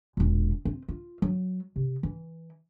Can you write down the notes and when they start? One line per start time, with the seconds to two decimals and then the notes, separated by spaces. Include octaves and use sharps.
0.17 E1 A#2
0.65 C4
0.88 F4
1.22 F#3
1.76 C3
2.03 E3